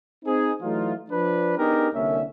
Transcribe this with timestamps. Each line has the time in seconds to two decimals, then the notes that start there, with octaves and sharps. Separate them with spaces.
0.25 C4 D#4 G#4
0.62 E3 F#3 A3 D#4 F4
1.10 F3 D4 B4
1.58 B3 D4 D#4 G4 G#4 A#4
1.94 C2 D3 A#3 C#4 E5